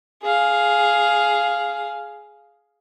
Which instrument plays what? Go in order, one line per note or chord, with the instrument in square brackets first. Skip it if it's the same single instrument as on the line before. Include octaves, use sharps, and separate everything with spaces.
[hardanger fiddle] G#4 F5